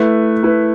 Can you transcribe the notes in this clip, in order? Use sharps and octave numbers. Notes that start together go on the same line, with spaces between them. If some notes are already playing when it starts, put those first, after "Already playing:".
Already playing: A3 E4 B4
A3 E4 B4